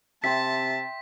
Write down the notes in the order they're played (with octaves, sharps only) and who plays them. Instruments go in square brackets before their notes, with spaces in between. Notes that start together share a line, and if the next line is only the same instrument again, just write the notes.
[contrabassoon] C3 [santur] E5 G5 C6 [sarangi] A5 [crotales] B6